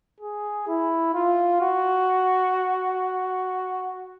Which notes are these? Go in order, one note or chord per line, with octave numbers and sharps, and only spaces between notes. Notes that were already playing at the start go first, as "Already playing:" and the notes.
G#4
E4
F4
F#4